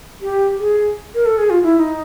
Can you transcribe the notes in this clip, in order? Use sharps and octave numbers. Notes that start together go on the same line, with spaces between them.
G4
G#4
A#4
A4
G#4
F4
E4
E4
D#4